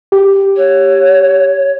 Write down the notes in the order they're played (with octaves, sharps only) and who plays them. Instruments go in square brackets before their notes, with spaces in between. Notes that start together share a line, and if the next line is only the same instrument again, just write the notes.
[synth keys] G4
[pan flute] C#5